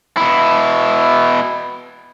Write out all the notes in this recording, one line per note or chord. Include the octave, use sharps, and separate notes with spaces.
B2 E4